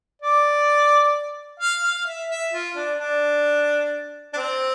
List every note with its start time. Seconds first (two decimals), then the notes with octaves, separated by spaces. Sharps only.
0.22 D5
1.60 F5
1.84 F5
2.06 E5
2.30 E5
2.53 F4
2.76 D4
2.99 D4
4.33 D4
4.37 C4